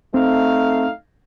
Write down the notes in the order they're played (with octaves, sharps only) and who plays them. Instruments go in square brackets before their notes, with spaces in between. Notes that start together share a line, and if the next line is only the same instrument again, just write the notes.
[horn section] A3 D#4 F5 [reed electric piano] C4